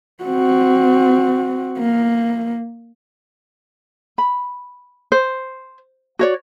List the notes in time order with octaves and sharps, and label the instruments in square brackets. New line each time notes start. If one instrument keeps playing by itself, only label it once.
[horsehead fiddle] C4 F#4
A#3
[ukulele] B5
C5
F#4 C#5 D5